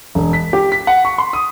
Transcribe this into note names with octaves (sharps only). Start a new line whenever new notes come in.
E1
B6
G4
B6
F#5
C#6
C6
D#6